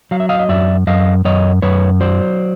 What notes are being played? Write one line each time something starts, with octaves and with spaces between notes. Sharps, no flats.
F#3 F5
E5
D#5 F5
D#5
F#2 D5 E5
F#2 D#5 F5
F#2 C#5 D#5
F#2 B4 C#5
F#3 C5 D5